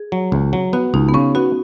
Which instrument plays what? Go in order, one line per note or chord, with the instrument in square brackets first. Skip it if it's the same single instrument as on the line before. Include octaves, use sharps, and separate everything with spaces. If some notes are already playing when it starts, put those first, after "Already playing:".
Already playing: [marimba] G#4
[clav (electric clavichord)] F#3
C#2
F#3
[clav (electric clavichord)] B3 [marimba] F#4
[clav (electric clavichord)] C#2 [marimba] D#4
[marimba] B3
[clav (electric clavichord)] C#3 [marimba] C#4
[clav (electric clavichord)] B3 [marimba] F#4